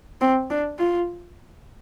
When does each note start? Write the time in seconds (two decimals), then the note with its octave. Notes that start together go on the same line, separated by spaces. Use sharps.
0.21 C4
0.50 D4
0.79 F4